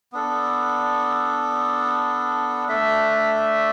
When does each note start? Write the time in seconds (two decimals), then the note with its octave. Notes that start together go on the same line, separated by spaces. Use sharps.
0.12 B3 D4 A4
2.68 A3 D4 A4 E5